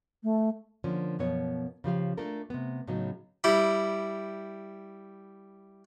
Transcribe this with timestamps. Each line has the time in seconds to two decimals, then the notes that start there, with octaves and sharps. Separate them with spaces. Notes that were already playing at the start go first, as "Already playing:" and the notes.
0.23 A3
0.84 D3 F3 A#3 C#4
1.19 F#2 B2 F3 B3 C#5
1.84 C#3 F3 G4 F5
2.17 A3 D4 F4 A4 A#4
2.50 C3 B3
2.87 A2 C#3 F#3 B3 D#4
3.44 G3 E4 G4